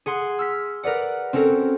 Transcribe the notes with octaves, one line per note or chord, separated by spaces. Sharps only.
G#4 F#5 C6 C7
E6 F6 B6
A#4 B4 D5 F#5
C4 C#4 F#4 A4 A#4